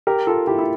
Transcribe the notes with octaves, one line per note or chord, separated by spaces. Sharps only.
G4 A#4
F4 A4
E4 G4
E4